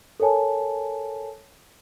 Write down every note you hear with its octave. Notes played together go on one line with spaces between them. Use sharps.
A4 A#4 C#5 G#5 A5